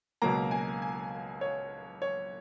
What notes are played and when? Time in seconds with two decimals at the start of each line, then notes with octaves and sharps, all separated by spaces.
0.22 C#2 B2 F#3 A#3 A#5
0.51 G#5
0.82 G#5
1.41 C#5
2.02 C#5